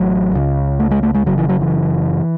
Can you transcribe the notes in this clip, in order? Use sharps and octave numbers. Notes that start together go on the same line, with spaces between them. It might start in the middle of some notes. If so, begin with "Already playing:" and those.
Already playing: A1 A2 F#3
C#2 C#3
A3
G#3
A3
G#3
F#1 F#2 C#3 F#3
E3
F#3
E3